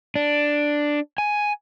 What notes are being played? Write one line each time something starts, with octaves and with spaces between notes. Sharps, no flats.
D4
G#5